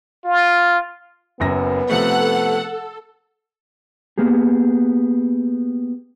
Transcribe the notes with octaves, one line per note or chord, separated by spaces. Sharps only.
F4
F#1 F#2 B3 A#6
C3 F3 A3 A4 F#5
A#3 B3 G4 G#4